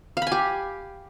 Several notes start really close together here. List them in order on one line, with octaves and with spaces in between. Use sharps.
F5 B5 G#5 G4